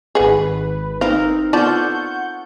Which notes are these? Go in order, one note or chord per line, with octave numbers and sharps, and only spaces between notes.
G#1 G#4 B4 F#5
C4 D#4 A#4 F5
B3 F4 A4 D5 F#5 A5 C#6 G6